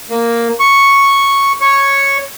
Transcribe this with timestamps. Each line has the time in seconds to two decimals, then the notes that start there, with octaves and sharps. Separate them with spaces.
0.10 A#3
0.60 C#6
1.61 C#5